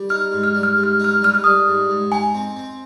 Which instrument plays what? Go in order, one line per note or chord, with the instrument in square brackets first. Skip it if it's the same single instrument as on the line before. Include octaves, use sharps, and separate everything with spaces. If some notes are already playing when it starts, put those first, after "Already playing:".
Already playing: [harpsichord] G3
[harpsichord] D#4 [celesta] F6
[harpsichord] G#2
[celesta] F6
[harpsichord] G3
[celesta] F6
[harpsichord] G#2
[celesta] F6
[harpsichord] D#4 [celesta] F6
[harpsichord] G3 [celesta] F6
[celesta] F6
[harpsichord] G3 [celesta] D#6
[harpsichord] G#2
G#2
[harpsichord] D#4 [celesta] G#5
[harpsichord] C4
C4